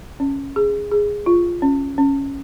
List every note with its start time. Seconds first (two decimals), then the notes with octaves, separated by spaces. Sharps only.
0.20 C#4
0.56 G#4
0.91 G#4
1.26 F4
1.62 C#4
1.98 C#4